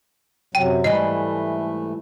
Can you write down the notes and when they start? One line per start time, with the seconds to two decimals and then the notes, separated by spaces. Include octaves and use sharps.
0.55 F#2 C3 F#3 G5
0.84 G#2 E3 G3 A3 D#5